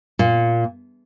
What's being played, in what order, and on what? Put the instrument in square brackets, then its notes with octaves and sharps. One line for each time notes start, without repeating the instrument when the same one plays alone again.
[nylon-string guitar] A#2